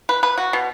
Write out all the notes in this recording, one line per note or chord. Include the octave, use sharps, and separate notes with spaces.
B4
B4
F#4
B2